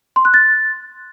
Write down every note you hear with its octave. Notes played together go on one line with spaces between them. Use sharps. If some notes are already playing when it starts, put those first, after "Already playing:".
C6
F#6
A6